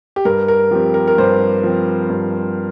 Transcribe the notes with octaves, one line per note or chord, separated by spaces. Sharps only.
G4
G2 A#4
A#4
F3 C4 G4
A#4
A#4
G2 C5
F3 C4
G2